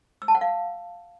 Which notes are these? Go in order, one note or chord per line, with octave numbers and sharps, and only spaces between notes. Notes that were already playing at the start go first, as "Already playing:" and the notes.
E6
A5
F#5
F5